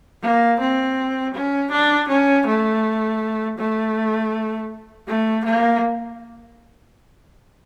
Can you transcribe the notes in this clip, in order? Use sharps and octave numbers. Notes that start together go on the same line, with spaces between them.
A#3
C4
C#4
D4
C#4
A3
A3
A3
A#3